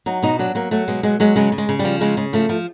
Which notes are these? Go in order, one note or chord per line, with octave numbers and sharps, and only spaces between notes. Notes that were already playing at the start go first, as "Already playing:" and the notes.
F#3 D#4
B2 D#4
F#3 D4
F#3 A#3
F#3 A3
B2 G#3
F#3 G#3
F#3 G#3
C#3 G#3
C#3
G#3
C#3
G3
F3
C#3 G#3
C#3
F3 A3
F3